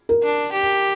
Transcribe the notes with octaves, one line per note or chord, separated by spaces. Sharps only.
A#4
D4
G4